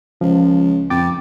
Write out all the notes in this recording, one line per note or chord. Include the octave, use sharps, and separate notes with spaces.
C#2 F3
F2 G5 D6 A6